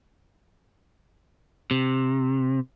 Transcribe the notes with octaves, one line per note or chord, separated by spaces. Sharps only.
C3